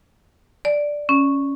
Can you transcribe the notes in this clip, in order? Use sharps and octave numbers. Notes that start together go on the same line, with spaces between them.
D5
C#4